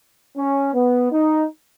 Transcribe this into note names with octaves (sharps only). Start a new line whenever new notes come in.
C#4
B3
D#4